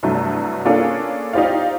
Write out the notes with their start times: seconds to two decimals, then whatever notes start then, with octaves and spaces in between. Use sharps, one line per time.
0.03 C2 G2 F#3 A3
0.65 A#3 C#4 D4 F4 G#4 A4
1.33 D#4 F4 G4 C5 D5 F5